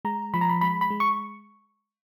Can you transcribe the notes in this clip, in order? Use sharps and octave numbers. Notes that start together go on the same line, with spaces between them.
G#3 A#5
F3 B5
A#5
B5
G#3 B5
B5
G#3
C#6